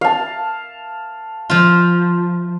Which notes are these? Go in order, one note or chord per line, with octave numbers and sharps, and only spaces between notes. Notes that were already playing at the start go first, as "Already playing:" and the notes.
F5 A5
F3 F4